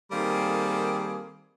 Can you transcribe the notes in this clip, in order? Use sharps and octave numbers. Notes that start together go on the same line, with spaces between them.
D#3 G3 A#3 C4 G#4 A4